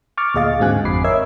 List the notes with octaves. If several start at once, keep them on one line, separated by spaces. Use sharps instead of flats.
C#6 D6 F6 A6
D2 A#2 G#4 D#5 F5 A6
G#2 D3 C4 F#4 G#5 F#6
G#1 F2 B5 D6 C7
A#4 C#5 D#5 E5 E6 G#6